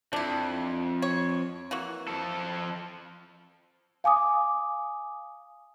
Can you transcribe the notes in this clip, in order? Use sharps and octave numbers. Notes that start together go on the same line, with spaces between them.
F2 D4 E4
C#5
E3 A#3 F#4
F3 A4
F5 G#5 D6 D#6